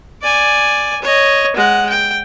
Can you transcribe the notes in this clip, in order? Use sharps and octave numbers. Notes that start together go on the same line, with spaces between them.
D5 G#5
C#5 D#5
G#3 F#5
G5